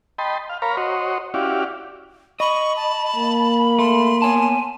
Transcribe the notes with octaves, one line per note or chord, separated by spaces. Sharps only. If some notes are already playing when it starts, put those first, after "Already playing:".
D#5 G5 A5 B5 C6
F5
A#4 C#5 F5 A#5 B5
F#4 C5 C#5 D#5
C#4 E4 F#4 G4 D5 F5
D#5 B5 C#6
A5
A#3
A3 C6
B3 C#5 G#5 A5